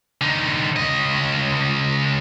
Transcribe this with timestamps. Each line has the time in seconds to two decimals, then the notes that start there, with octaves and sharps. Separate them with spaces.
0.21 D3 D#4
0.76 C#2 D#5